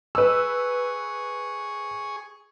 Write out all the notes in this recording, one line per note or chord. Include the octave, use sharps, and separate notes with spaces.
G#4 B4 C#6 E6